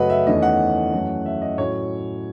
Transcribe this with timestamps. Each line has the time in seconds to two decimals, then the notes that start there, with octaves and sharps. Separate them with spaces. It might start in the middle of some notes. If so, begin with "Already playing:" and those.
Already playing: F#2 C#3 F#3 A3 B4 D#5 F#5
0.10 E5
0.27 E2 D#3 A3 C#4 D#5
0.42 F#5
0.92 F#2 E3 A3 C#4
1.26 E5
1.42 D#5
1.58 A2 F#3 C#4 C#5